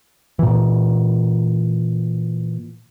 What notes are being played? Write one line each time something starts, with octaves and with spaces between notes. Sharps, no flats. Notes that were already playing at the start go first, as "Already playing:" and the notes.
A#2 E3